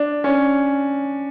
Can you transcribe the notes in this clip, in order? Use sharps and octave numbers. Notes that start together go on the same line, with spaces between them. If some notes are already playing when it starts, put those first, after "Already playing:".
Already playing: D4
C#4